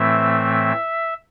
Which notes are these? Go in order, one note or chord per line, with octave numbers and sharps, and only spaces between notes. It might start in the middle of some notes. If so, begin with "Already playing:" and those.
Already playing: A2 E3 A3 C4 E5